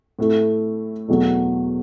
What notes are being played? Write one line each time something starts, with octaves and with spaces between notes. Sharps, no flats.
A2 A3 E4
E2 B2 F#3 A3